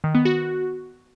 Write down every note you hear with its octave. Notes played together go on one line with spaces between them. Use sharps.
D#3
B3
F#4